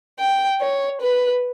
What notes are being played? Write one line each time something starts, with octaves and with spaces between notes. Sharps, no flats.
G5
C#5
B4